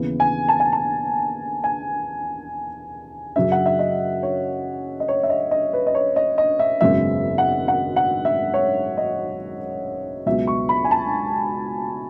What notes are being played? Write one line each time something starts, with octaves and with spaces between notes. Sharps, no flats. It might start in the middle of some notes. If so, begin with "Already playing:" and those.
Already playing: D#2 C#3 E3 B3
G#5
A5
G#5
A5
G#5
F#2 C#3 F#3 C#4 E5
F#5
E5
D#5
C#5
D#5
C#5
E5
D#5
D#5
B4
D#5
C#5
D#5
D#5
E5
G#1 F#2 C#3 G#3 B3 E5
F#5
F#5
F#5
E5
C#5
D#5
C#2 B2 F#3 B3 E5
C#6
B5
G#5
A5